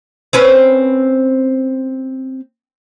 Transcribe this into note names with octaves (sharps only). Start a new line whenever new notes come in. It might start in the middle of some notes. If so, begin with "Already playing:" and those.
C4 C#4 B4